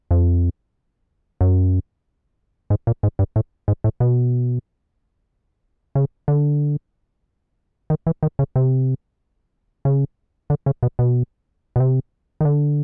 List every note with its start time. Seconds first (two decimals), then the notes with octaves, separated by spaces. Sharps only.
0.11 F2
1.41 F#2
2.70 G#2
2.87 A#2
3.03 G#2
3.19 G2
3.36 A2
3.68 G#2
3.84 A2
4.00 B2
5.95 C#3
6.28 D3
7.90 D#3
8.07 E3
8.23 D#3
8.39 C#3
8.56 C3
9.85 C#3
10.50 D3
10.66 C#3
10.83 B2
10.99 B2
11.76 B2
11.80 C3
12.41 D#3
12.45 D3